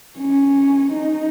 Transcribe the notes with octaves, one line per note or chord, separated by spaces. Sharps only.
C#4
D#4